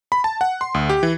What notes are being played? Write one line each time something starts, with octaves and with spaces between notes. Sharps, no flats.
B5
A5
F#5
C6
D2
G4
E3